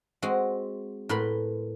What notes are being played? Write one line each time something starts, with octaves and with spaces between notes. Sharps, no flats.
G#3 C4 F#4
A2 A#4 B4 B5 C6